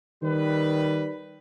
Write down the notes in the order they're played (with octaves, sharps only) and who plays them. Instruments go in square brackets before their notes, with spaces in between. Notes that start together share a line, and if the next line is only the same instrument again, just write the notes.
[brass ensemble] D#3 G3 B4